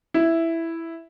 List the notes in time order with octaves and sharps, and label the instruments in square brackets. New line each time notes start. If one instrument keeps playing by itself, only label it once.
[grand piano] E4